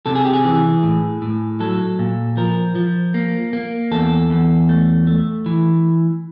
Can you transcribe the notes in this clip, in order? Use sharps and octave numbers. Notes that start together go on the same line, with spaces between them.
C3 A4
G#4
G4
G#4
E3
A2
A2
F#3 A4
A#2
F3 A#4
F3
A#3
A#3
E2 A4
E2
A3
A3
E3